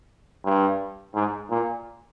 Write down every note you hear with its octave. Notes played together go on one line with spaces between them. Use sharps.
G2
G#2
A#2